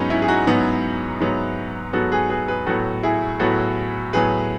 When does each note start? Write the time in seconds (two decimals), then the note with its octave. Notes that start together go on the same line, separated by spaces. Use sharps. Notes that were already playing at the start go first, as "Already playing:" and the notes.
Already playing: G#2 F#3 B3 C#4 D#4
0.10 C#4 E4
0.22 G#4
0.28 D#4 F#4
0.47 G#2 F#3 B3
1.20 G#2 F#3 B3
1.93 G#2 F#3 B3 F#4 A4
2.12 G#4 B4
2.30 G#4 B4
2.48 G#4 B4
2.67 A2 F#3 B3 F#4 A4
3.03 E4 G#4
3.40 A2 F#3 B3 F#4 A4
4.13 A2 F#3 B3 G#4 B4